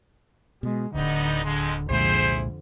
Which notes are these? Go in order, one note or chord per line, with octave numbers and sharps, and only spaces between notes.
B2 G#3
D1 D2 D3 G3 B3 D#4
F2 D3 G#3
C2 F2 A#2 D3 G#3 E4 G#4 C5